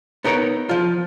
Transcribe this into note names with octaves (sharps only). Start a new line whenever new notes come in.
B3 D#4 A#4 C#5
F3 F4